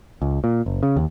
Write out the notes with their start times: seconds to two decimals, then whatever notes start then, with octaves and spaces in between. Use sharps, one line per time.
0.22 C#2
0.44 A#2
0.66 F#1
0.83 C#3
0.96 D#2